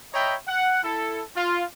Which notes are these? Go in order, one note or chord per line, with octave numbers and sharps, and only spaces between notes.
C#5 D#5 E5 G5 A#5 B5
F#5
E4 A4
F4